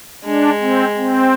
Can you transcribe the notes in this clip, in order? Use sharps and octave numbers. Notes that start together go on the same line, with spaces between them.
G#3 D4
C4
C4